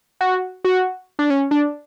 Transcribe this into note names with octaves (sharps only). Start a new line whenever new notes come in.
F#4
F#4
D4
C#4
D4